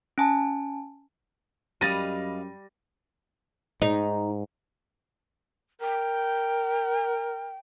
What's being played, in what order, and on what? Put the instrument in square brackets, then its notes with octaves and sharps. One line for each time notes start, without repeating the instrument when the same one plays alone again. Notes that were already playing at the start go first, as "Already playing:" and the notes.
[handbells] C#4 G#5 A5
[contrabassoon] F#2 [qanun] G3 [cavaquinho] D#5 F5 B5 [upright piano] A6 A#6 D#7
[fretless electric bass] G#2 [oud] D#4
[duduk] A#4 [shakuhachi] G5